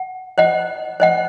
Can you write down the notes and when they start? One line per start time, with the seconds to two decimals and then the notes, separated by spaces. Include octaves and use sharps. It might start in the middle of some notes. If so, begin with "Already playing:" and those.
Already playing: F#5
0.38 C5 D#5 F#5
1.00 C5 D#5 F#5